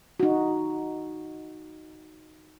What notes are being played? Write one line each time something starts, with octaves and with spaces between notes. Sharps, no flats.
D#4 F#4